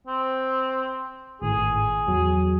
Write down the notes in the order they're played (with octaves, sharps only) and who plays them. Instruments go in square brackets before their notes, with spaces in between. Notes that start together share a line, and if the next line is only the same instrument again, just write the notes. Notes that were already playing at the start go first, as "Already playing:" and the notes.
[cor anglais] C4
[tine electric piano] G#1 A2 [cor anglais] G#4
[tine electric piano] E2 F#3 F#4